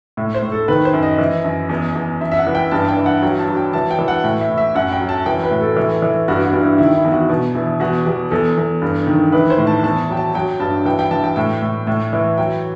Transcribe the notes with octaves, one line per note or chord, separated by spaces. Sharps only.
A2
C5
A2
A4
D#3 B4
C5
F#2
D#5
E3
F#2
E2
E2
F#2 E5
E5
F#5
E3
G5
G2 A5
G5
E3
F#5
F#3 G5
A5
F#3
G5
E3 A5
G5
E3
F#5
A2 G5
E5
A2
E5
F#2 F#5
G5
F#3
A5
E3 G5
B4
A2
A4
E3
E3
G2 F#4
F#4
G2
E4
D#3 E4
E4
E2
F#4
B2
E2 E4
E2 F#4
E2 G4
E2 A4
E2
G2
D#3
E3 B4
C5
A2
A5
E2 A5
F#3 G5
A5
F#3 G5
G2 A5
E3 G5
G5
E3 A5
G5
A2 G5
A2
A2
E3
F#3 G5